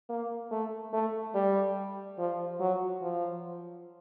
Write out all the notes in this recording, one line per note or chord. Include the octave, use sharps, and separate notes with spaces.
A#3
A3
A3
G3
F3
F#3
F3